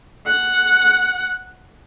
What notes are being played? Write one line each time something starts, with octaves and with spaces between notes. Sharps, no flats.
F#5